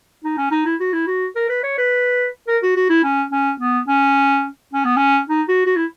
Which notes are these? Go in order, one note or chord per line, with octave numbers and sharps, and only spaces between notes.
D#4
C#4
D#4
E4
F#4
E4
F#4
A#4
B4
C#5
B4
A#4
F#4
F#4
E4
C#4
C#4
B3
C#4
C#4
B3
C#4
D#4
F#4
F#4
E4